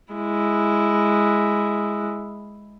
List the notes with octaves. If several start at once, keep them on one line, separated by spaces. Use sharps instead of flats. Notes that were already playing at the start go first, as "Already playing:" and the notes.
G#3 E4